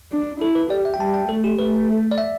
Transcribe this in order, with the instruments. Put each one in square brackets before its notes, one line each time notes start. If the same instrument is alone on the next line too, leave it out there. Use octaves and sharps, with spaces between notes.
[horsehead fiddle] D4
[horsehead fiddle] E4 [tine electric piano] A4
[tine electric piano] B4
[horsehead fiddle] G4 [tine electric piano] D5
[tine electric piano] E5
G5
[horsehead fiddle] G3 [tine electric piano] A5
[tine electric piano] G5
[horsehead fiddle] A3 [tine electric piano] A4
[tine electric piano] G4
[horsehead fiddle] A3 [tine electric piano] B4
[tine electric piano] D5
E5